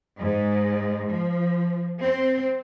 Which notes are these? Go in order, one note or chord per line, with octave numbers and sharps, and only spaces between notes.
G#2
F3
C4